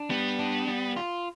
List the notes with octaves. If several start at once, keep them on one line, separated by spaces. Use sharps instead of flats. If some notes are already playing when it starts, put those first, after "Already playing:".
Already playing: D4
G3 B3
D4
G3
F4